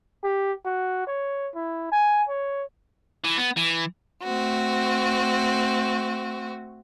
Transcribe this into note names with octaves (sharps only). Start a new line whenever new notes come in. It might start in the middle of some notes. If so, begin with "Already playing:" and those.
G4
F#4
C#5
E4
G#5
C#5
E3
B3
E3
A3 C4 F#4